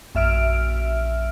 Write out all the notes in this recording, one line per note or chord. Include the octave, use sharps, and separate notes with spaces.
A#1 F#2 E5 F6 D7